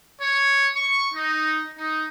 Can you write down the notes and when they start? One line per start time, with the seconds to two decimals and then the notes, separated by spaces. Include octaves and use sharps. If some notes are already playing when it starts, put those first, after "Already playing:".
0.22 C#5
0.75 C#6
1.14 D#4
1.78 D#4